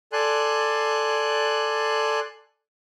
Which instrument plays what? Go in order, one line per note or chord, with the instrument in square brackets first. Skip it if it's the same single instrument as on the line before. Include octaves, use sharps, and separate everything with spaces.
[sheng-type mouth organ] A4 D5 G#5 C6 F#6